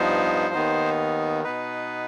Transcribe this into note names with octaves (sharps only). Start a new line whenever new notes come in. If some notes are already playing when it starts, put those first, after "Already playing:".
Already playing: G2 F3 B3 D#4 C5
D#2 D#3 B3 D#4
B2 B3 D#4 B4